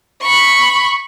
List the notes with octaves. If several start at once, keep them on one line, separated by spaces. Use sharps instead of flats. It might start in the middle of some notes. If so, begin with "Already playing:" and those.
B5 C#6